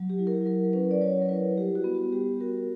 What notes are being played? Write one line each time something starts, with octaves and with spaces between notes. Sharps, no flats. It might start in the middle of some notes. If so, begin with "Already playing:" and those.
Already playing: F#3
G4
E4
A#4
F#3 A#4
C#4 B4
D5
F#3 C#5
A#4
E4 B4
G3 G4
F#4
B3
F#4
G3 G4
F#4 A#4